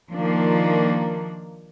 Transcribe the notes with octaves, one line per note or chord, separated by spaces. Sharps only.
D#3 F3 A#3 D4